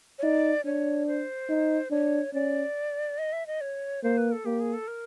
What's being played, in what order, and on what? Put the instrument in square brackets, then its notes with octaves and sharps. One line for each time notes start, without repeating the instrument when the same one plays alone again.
[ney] C#5
[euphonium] D#4 [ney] D5
[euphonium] D4 [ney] C#5
[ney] C5
[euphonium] D#4
[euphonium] D4 [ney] C#5
[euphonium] C#4 [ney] D5
[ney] D#5
E5
D#5
C#5
[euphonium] A#3 [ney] C5
[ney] B4
A4
[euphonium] A#3 [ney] G4
[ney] G#4
A4
A#4